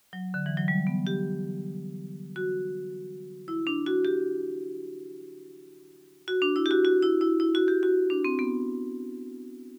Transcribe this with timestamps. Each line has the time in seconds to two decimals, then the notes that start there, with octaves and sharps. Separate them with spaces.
0.13 F#3
0.34 D3
0.46 E3
0.57 F#3
0.68 G3
0.87 B3
1.07 G4
2.36 F#4
3.48 E4
3.67 D4
3.86 F#4
4.05 G4
6.28 F#4
6.42 D4
6.56 E4
6.66 G4
6.71 F#4
6.85 F#4
7.02 E4
7.21 E4
7.40 E4
7.55 F#4
7.68 G4
7.83 F#4
8.10 D4
8.25 C4
8.39 B3